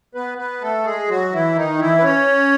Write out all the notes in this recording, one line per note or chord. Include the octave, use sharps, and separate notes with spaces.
B3 B4
B3 B4
A3 A4
G#3 G#4
F#3 F#4
E3 E4
D#3 D#4
E3 E4
B4
C#4 C#5